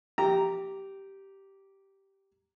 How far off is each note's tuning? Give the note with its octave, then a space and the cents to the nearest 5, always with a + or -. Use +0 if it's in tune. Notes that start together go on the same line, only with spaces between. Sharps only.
G4 -10 A#5 +0